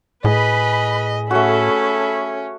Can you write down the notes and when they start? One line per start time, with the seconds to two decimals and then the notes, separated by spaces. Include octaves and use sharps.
0.24 A2 G#4 B4 D#5 B5
1.31 A3 C#4 F#4 A4 B5